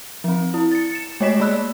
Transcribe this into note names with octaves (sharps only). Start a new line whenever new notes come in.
F3 C4
E4
A6 C#7
C#7 E7
G#3 A3 C#5 D#5 B6 E7
A#3 D5 B5 E6 F#6